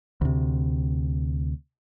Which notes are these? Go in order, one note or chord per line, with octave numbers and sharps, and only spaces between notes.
D2 C3